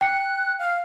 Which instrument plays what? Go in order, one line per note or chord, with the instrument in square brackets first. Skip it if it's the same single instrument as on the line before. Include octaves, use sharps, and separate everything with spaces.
[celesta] G5 C#7 [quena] F#6
[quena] F5